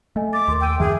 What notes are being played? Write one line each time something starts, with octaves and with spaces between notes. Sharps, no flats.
A3 A4 D#5 G#5
D6 A6
D#2 A#4 C6
G5 D6 E6 D#7
F#2 D#3 F3 G#4 E5